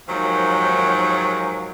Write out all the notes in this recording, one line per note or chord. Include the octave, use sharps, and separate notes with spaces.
D#2 G#2 D#3 F3 F#3